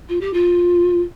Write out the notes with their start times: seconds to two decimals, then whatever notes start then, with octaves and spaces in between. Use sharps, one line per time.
0.09 F4
0.20 G4
0.33 F4